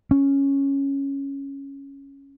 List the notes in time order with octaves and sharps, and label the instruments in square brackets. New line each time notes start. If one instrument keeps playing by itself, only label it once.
[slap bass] C#4